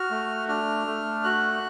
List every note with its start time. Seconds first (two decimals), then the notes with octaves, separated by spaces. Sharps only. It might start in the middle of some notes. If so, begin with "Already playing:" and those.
Already playing: F#4 F6
0.11 A3
0.48 D4 F6
0.87 A3
1.24 F#4 F#6